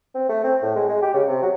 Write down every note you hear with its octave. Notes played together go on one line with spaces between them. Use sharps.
C4
A3
C4
A2
G#3
G#3
G4
C#3
C3
F#3